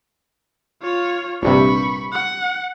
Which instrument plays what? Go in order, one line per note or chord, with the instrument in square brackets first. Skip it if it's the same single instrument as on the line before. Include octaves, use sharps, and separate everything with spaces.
[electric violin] F4 C#5
[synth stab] A#1 G2 C3 [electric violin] B5 C#6
[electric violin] F#5